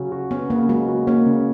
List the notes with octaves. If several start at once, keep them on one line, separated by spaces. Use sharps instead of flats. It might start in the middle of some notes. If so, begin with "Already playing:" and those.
Already playing: C#3 F#3 C#4 F#4
F#4
B3 C#4
C#3 A#3
F#3 G#3
F#4
A#3 C#4
C#3